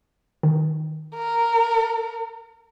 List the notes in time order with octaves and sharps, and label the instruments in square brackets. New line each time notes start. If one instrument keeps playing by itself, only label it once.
[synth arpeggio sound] D#3
[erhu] A#4